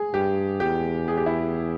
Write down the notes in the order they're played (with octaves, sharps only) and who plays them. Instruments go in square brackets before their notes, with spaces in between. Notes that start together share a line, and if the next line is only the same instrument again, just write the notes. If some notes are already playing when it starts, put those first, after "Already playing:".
Already playing: [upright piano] G#4
[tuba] G2 [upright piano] G4
[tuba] E2 [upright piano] G4
[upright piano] G#4
G4
E4